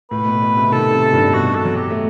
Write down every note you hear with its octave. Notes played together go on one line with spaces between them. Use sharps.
A2 B4
B2
B2
C3
D#3 A4
C3
G2
B2 F#4
A4
F#3
G4
A3